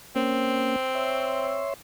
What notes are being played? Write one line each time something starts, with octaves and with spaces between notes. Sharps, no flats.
A#3 C4 C#4
C#5 E5 C6